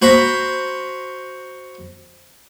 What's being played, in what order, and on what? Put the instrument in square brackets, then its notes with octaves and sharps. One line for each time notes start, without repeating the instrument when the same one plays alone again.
[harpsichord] F#4 C5 A#5 B5